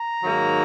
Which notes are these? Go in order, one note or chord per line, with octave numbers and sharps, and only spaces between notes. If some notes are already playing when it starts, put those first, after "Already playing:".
Already playing: A#5
G#2 D#3 F#3 A#3